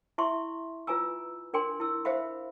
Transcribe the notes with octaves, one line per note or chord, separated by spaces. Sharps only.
E4 E5 C6 C#6
F4 B4 G#5 A#5 E6
D4 A#4 G5 G#5 C6
E4 E6
C5 E5 F5 B5